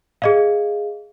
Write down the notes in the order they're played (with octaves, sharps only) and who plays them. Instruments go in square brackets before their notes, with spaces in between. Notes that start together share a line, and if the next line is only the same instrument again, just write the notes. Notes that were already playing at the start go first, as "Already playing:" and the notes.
[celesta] G#4 D#5 F5